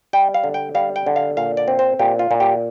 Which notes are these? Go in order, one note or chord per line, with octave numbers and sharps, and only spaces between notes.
G3 G5
F5
D3
G5
G3 F5
G5
D3
F5
A#2 F5
D5
C4
C5
A#2 G4
F4
A#2
G4